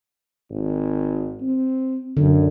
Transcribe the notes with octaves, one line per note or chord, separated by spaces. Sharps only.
G#1
C4
F#2 D3